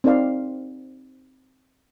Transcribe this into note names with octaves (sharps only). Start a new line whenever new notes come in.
C4 D#4 A#4 D5 F5